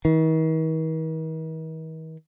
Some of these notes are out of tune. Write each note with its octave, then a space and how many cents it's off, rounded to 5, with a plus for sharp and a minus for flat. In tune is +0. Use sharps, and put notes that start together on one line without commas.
D#3 +45